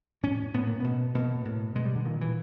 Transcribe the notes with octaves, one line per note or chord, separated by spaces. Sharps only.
A2 C#4
A2 B3
A#3
B2 B3
B2 A#3
A2
B2 G#3
G3
D3
A#2 D#3
E3